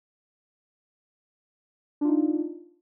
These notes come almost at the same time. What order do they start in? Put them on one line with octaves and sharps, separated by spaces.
D4 F4 D#4